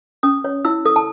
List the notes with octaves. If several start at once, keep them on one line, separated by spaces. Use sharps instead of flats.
C#4 D#6
C#5
E4 E6
A4 D#6
A5